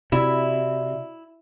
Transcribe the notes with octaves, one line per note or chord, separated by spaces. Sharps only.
C3 E4 F#4 D5 E5